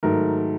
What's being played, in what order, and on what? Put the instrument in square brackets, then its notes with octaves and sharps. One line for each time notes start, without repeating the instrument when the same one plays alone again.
[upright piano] G#2 D#3 F#3 A3 A#4